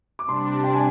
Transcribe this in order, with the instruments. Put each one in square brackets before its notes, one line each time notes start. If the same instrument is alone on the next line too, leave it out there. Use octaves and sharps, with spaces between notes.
[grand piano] D6
[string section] C3 G3 D4 [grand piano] C6
[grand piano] G5
G#5